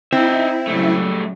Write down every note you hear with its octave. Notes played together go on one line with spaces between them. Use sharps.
C4 D#4 E4 E5
A#2 C#3 F#3 G3 A3